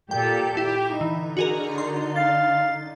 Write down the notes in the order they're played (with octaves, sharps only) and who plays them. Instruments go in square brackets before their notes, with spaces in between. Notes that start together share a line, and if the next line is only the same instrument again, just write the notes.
[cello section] A#2 G4 A4 [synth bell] G5
[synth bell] E4 [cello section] G4
[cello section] D3 D#4 [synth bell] E3
[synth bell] F#4 G#4 A#4
C6
[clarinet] F5 [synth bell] A6